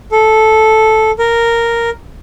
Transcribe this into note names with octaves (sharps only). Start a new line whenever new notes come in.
A4
A#4